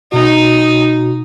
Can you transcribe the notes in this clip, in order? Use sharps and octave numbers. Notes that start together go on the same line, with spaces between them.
B2 D#4 F#4